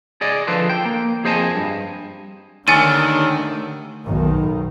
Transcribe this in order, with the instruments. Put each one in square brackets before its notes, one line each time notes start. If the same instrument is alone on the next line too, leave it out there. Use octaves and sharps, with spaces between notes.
[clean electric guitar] G#4 D5 D#5
D3 F3 A4 B4 C5
G5
A#3
F2 G#4 C5 D#5 G#5 A5
G2
[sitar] D#2 [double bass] D3 A3 [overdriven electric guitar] D#3 [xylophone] G#5 A6 D#7
[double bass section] B1 D#3